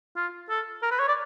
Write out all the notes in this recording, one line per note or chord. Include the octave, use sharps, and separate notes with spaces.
F4
A4
A#4
B4
C#5
D5